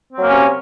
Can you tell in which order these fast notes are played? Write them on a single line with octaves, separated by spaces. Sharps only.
C4 F#3 A#3 C#4 C3